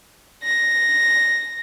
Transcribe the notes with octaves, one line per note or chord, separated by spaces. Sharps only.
A#6